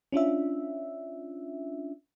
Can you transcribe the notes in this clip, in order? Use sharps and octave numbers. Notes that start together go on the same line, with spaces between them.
C#4 D4 F4 E5